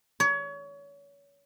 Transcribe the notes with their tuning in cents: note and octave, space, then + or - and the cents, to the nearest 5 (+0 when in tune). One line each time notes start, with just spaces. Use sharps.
C#5 +30